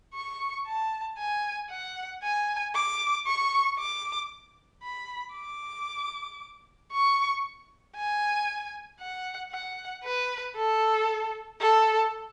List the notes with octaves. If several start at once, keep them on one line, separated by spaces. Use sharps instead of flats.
C#6
A5
G#5
F#5
G#5
D6
C#6
D6
B5
D6
C#6
G#5
F#5
F#5
B4
A4
A4